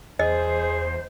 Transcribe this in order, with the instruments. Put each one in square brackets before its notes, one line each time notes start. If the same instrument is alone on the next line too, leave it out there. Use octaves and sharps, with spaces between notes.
[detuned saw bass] E2 [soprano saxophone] G#4 [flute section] C5 [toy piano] D#5